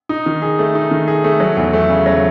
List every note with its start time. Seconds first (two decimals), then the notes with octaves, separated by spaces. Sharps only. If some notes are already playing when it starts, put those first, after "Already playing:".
0.09 D#4
0.26 D#3
0.42 G#4
0.59 A3
0.75 D#4
0.91 D#3
1.08 G#4
1.24 A3
1.40 F#3
1.57 E2
1.73 A3
1.89 C#3
2.06 F#3